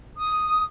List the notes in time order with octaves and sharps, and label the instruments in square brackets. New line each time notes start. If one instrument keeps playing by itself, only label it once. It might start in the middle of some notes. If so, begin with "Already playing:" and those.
[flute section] D#6